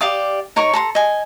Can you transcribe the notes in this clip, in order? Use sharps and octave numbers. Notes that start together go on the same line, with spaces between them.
G4 D5 F5 D#6
D#4 A#4 C#5 C#6
A4 A#5 C6
D#5 G#5